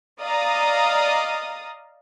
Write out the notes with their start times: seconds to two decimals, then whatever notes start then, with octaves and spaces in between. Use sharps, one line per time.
0.21 D5 D#5 F5 A#5 D#6